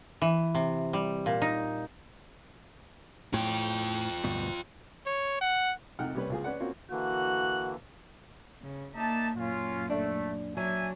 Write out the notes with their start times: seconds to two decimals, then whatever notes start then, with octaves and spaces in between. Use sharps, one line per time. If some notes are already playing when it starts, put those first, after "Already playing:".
0.22 E3
0.55 C3
0.93 G3
1.26 A#2
1.42 D#4
3.34 A2 F4 G5
4.24 D2 G2 B2
5.06 C#5
5.41 F#5
5.99 C2 F2 D#4 F#5 G5 F6
6.14 C2 G3 C#4 B4
6.30 C#2 F4 G#4
6.44 C#4 B4 D5 F#5
6.60 A#3 C4 C#4 F4 F#4
6.91 D3 E3 A#3 F#4 F#6
8.62 C#3
8.95 A#3 D#4 D5 E5 A5
9.38 F#2 A#2 C#4 F4
9.90 A3 D4
10.57 F#3 D4 E5 G#5